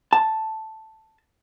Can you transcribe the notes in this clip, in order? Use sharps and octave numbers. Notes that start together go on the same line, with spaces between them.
A5